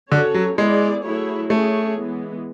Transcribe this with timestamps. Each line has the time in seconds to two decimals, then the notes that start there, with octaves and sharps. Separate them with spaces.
0.12 D3 C#4 F#4 A4 C#5
0.34 F#3
0.58 G#3 B3 E4 G#4 D5
1.04 F#3 A3 E4 G#4 C#5
1.50 A3 C#4 G#4 C#5
1.97 E3 G#3 B3